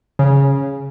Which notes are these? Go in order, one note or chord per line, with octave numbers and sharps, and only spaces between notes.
C#3